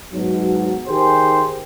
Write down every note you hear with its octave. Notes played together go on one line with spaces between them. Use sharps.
G#2 B2 F#3
D#3 G4 G#4 C5